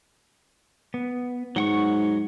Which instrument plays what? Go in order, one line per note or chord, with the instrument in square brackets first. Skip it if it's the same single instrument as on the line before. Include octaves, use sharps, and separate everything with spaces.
[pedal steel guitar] B3
[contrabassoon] G#2 [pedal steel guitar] F#3 F#5 C#6